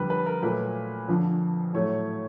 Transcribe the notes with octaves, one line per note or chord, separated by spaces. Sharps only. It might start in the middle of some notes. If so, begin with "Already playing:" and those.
Already playing: F2 D3 G3 B4
B4
A#4
A#2 F#3 A3 B4
F2 D3 F3
A2 F#3 A3 C#5